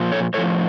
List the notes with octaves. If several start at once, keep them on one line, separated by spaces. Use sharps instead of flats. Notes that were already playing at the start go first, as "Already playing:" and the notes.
Already playing: A#2 F3
A4 C#5
A2 F3 A4 C#5